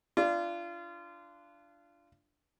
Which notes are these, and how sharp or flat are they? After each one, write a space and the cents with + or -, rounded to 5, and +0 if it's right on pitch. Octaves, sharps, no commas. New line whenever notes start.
D4 +0 F4 -25